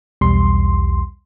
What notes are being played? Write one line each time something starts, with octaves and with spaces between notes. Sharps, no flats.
B1 E2 G3 C6